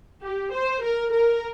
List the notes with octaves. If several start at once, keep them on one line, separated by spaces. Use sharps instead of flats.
G4
C5
A#4
A#4